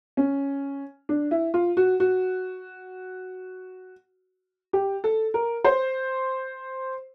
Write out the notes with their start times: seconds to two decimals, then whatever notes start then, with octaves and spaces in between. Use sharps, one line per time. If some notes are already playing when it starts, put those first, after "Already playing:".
0.17 C#4
1.09 D4
1.31 E4
1.54 F4
1.77 F#4
2.00 F#4
4.73 G4
5.04 A4
5.34 A#4
5.64 C5